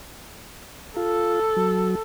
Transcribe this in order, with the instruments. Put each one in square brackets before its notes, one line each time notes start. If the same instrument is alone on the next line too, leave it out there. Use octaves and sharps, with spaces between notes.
[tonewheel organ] F4 [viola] A4
[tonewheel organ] F#3